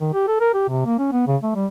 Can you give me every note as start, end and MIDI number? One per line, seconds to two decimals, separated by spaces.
0.01 0.11 51
0.13 0.27 67
0.28 0.40 69
0.41 0.50 70
0.54 0.67 67
0.68 0.85 48
0.85 0.98 58
0.99 1.12 61
1.12 1.26 59
1.27 1.37 49
1.43 1.54 57
1.55 1.66 55